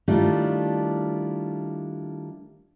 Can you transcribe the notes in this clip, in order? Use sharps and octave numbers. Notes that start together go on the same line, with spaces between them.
D#3 G3 A3 D4 E4 F4